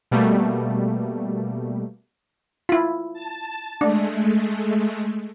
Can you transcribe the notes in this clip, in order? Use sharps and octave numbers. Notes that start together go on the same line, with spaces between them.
B2 G3 A3 A#3
E4 F4
A5
G#3 A3 D4